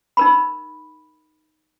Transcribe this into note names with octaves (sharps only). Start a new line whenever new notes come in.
D#4 A#4 B5